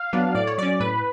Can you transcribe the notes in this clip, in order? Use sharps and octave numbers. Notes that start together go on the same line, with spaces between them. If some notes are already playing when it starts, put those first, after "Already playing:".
Already playing: F5
F#3 B3 D4
A2 D5
C#5
F#3 C#4 D5
A2 B4